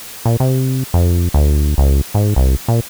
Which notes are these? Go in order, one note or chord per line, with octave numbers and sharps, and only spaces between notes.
A#2
C3
F2
D2
C#2
G#2
C2
A#2